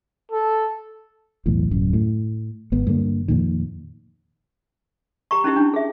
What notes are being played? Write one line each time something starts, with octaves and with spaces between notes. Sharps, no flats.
A4
B1 E2 A2
D1 F#2
A2
G#1 B3
G2 D3 A#3
F2 A#2 D#3
G4 A#5 C#6
C#4 D#4 E4 G4
D4
G#4 E5